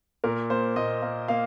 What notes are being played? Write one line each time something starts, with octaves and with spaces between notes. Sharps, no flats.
A#2 A#4
A#3 C5
A#2 D#5
A#3
A#3 F5